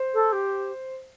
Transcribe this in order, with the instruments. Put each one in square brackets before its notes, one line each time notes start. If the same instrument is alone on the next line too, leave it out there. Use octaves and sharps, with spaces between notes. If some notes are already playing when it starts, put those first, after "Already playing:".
Already playing: [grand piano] C5
[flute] A4
G4